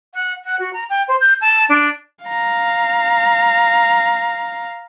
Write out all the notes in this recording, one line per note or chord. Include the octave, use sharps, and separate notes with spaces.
F#5
F#5
F#4
A#5
G5
C5
G6
A5
D4
F5 A#5